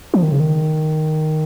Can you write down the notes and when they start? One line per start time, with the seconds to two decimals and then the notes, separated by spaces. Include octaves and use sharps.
0.14 F3
0.23 D#3
0.32 C#3
0.40 D#3